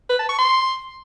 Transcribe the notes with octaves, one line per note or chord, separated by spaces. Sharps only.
B4
A5
C#6
C6